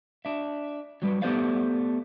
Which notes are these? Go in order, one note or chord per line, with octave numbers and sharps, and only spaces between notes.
D4 E5
F#3 G3 B4
A3 B3 G4 C5 D5 F5